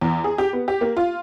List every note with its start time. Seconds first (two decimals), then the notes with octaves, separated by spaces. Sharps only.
0.01 E2
0.24 G#4
0.38 G4
0.53 B3
0.68 G4
0.81 A#3
0.97 F4